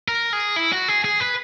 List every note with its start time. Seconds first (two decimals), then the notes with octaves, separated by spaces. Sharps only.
0.08 A#4
0.33 G#4
0.56 E4
0.73 F#4
0.88 G#4
1.04 G#4
1.20 B4